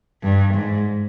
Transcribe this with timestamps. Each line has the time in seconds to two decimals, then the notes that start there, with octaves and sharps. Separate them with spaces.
0.23 G2
0.55 G#2